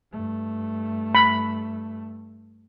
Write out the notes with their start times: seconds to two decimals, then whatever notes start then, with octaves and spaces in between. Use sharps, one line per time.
0.12 G2 A3
1.15 B5